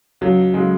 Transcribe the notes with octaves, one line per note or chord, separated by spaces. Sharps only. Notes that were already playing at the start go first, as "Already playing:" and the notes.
C#2 F#3
C#3 F#3 G#3